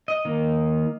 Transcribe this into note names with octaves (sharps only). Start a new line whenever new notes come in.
D#5
D#3 A#3